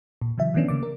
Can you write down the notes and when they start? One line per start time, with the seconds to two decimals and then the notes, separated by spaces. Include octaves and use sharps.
0.22 A#2
0.38 C#3 E3 F#3 E5
0.54 D#3 E3 A3 B3 C#4 D4
0.68 C#3 A#3 D6
0.83 A#4